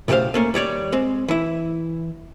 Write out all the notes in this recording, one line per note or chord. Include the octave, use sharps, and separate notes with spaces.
B1 A2 C#3 G4 C5 F5
A3 A#3 C#4
D#2 G3 C#5 D5
G#3 C4
E3 E4